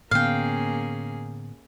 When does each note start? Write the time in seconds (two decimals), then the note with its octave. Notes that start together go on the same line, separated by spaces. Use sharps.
0.11 A2 D3 A#3 B3 C#4 G#4 F5 G5